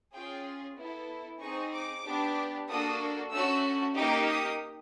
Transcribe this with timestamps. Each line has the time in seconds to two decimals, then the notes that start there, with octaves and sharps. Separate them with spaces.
0.13 C#4 F4 G#4 G5
0.76 B3 E4 A4
1.40 C4 D#4 G#4 C#6
1.73 D6
2.04 B3 D4 G4
2.68 A#3 D4 F#4 A4 D#6
3.31 A3 C#4 F#4 E6
3.95 A#3 D#4 G4 D6
4.28 D#6